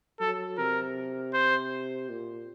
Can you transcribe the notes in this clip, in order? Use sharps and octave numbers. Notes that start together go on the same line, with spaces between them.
F#3 A4
C3 A#4
C5
A#2